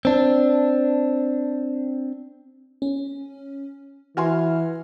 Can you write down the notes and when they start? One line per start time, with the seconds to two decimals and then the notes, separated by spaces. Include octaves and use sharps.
0.05 C4 D4
2.82 C#4
4.17 E3 F#4 G#5 C6 F6